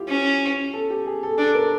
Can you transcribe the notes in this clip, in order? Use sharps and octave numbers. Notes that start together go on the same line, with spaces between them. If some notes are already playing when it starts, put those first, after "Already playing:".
Already playing: E4 F4 G4
C#4
A4
G4
G#4
A4
D4 A4
A#4